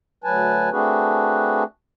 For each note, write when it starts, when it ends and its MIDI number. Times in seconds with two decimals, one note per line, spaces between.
0.24 0.70 38
0.24 0.70 54
0.24 0.70 71
0.24 0.70 80
0.24 0.70 81
0.72 1.63 57
0.72 1.63 60
0.72 1.63 62
0.72 1.63 66
0.72 1.63 68
0.72 1.63 71